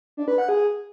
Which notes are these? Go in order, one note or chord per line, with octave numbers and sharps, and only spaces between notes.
D4
B4
F#5
G#4